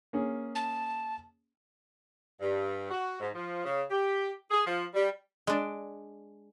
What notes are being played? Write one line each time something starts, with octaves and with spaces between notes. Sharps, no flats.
A#3 C#4 G#4
A5
G2
F#4
G#2
F3
C#3
G4
G#4
F3
G3
G#3 D4